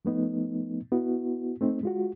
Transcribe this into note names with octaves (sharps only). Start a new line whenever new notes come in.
F3 A3 B3 D#4
B3 E4 F#4
A3 C4 D#4
G#3 F4 F#4